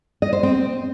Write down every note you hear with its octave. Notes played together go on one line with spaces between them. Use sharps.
D#5
C5
C4